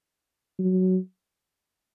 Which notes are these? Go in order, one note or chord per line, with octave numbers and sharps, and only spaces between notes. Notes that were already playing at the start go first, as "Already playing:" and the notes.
F#3